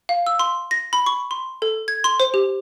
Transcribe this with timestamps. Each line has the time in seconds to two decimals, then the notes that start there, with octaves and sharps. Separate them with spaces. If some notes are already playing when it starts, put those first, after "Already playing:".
0.09 F5
0.27 E6
0.39 C6
0.71 A#6
0.93 B5
1.06 C#6
1.31 C6
1.62 A4
1.88 G#6
2.04 C6
2.20 C5
2.34 G4